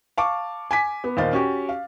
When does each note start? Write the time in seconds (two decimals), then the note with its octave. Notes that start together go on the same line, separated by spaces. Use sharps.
0.18 F5 A5 C#6 D6
0.71 G#5 D6 B6
1.04 B3
1.17 D#2 A#2 C5 D#5 F5 A6
1.33 C#4 F#4 G4
1.69 F5